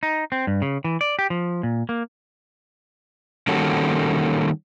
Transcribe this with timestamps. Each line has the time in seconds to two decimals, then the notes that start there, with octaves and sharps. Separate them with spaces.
0.03 D#4
0.32 C4
0.47 G2
0.62 C#3
0.84 E3
1.01 D5
1.19 G4
1.30 F3
1.63 A#2
1.89 A#3
3.48 D#3 G3 A#3 C#4 F#4 A4